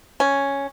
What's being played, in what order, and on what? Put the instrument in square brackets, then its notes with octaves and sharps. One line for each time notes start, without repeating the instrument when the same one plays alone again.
[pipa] C#4